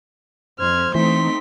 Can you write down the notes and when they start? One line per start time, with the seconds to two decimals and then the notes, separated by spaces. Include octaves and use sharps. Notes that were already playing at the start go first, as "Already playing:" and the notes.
0.59 F2 C5 F6 G#6
0.95 E3 A3 C4 D#4 C6 B6